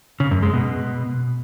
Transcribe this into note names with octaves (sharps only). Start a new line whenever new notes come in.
C#3
F#2
G#3
B2